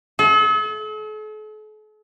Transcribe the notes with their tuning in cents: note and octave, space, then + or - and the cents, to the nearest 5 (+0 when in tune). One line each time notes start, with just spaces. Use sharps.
A4 -45